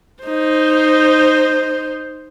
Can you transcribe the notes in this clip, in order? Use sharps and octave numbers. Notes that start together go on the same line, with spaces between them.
D#4 C5